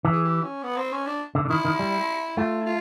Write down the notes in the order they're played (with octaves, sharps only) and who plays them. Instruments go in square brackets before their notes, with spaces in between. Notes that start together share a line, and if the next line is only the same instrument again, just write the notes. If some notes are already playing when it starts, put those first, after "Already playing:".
[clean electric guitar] E3
[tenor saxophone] G#4
G4
C#4
B3
C4
C#4
D4
[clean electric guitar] D3
D3
[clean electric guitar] D#3 [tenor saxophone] E4
[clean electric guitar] D#3
G3
[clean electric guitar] A3 [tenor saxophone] F4
[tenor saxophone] E4
F4